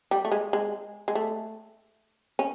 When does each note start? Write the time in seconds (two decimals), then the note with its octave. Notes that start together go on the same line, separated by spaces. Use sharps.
0.11 G3
0.25 A3
0.32 G#3
0.53 G#3
1.08 G#3
1.15 A3
2.39 C#4